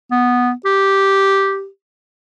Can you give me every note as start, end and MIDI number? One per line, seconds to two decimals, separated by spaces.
0.11 0.51 59
0.65 1.68 67